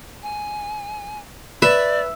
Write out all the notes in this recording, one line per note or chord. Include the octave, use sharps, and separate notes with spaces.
G#5
B4 D5 E5